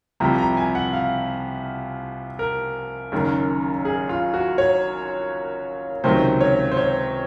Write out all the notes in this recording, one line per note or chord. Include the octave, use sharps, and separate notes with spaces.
C2 C3 F3 A#5
A#5
G#5
F#5
F5
A#4
F#1 F#2 D#3
G#4
F4
F#4
C#5
C#2 C3 D#3 F#3 C5
C#5
C5
C#5